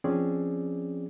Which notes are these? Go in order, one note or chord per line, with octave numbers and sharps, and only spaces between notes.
F3 C4 C#4 G#4 D5